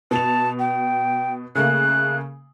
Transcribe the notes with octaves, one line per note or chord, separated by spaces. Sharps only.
B2 A5 F7
G5
C#3 A3 A#3 F#6